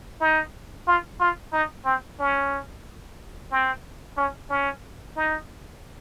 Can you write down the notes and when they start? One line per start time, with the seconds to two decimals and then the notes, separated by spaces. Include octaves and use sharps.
0.21 D#4
0.87 F4
1.20 F4
1.53 D#4
1.85 C4
2.19 C#4
3.51 C4
4.17 C#4
4.50 C#4
5.16 D#4